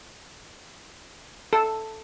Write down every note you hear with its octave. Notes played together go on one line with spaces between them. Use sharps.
A4